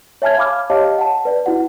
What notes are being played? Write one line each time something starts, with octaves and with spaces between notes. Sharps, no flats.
C#5 E5 G#5 A5 F6 G#6
F5 B5 D6 F6
G4 C#5 D#5 F5 A5
F#5 A5
B4 D5
E4 F#4 F#5